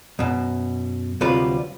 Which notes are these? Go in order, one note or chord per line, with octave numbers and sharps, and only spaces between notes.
F#2 B2
D2 C3 F#3 G3 F4 B4